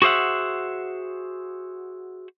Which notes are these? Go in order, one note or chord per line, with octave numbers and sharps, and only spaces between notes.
F#4 G#4 C5 E5 F#5